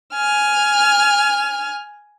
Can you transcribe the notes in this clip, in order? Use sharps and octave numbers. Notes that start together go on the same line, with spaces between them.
G#5 F6